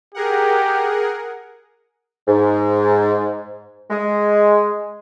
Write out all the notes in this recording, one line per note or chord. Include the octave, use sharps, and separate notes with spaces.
G4 G#4 A#4 F#5
G#2
G#3